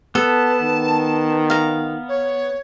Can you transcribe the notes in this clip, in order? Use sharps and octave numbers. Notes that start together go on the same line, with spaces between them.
B3 A4 A5
D#3
F5 A#5
C#5